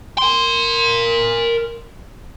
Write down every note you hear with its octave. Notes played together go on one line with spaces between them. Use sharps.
A#4 C6